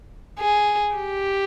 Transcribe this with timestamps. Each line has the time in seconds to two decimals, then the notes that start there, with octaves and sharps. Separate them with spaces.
0.39 G#4
0.96 G4